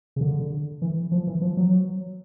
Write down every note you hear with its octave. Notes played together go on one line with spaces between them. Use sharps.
C#3
D3
E3
F3
E3
F3
F#3